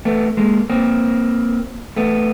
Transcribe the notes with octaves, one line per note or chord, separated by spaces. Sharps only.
A3 B3
G#3 A#3
A#3 C4
A3 B3